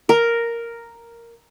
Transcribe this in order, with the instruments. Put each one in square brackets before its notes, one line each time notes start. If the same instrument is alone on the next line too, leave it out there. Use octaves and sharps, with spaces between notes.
[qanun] A#4